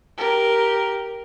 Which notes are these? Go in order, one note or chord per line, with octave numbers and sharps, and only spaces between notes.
G4 A#4